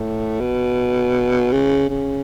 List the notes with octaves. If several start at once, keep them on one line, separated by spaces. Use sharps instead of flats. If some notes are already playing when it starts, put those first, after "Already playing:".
Already playing: A2
B2
C#3
C#3